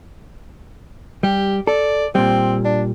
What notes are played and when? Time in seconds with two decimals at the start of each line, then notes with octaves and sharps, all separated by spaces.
1.23 G3 G4
1.67 A4 D5
2.15 A#2 G3 C4
2.65 D4